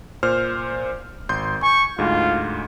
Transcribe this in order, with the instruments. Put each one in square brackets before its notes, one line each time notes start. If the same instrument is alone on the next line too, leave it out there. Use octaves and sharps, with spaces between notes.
[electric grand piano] A#2 C5 F6
G#1 C6 G6
[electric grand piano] G#5 [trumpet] C#6
[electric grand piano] D2 G#2 [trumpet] F4